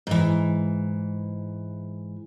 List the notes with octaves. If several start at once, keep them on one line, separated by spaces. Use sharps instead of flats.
G#2 E3